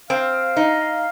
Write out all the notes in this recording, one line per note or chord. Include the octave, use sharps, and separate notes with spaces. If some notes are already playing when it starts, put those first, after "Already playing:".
C4 F5
D#4